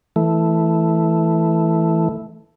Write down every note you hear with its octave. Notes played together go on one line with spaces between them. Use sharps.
E3 A3